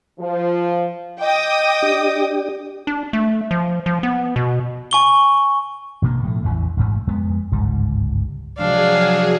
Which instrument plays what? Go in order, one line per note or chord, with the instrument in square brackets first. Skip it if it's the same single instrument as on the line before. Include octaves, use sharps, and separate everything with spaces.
[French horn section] F3
[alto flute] D#5 [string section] G5 D6 D#6
[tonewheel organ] D4 G4
[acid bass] D4
A3
F3
F3
B3
B2
[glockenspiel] G#5 C#6 G7
[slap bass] A1 B2 A#3 D4
A2 F3 A3
A1 E2 D3 E3
A1 D2 G#2
F2 G#3 B3
G1 C#2 G#2 G3
[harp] C3 F3 G#3 [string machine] F#3 G#4 [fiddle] D4 [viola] F5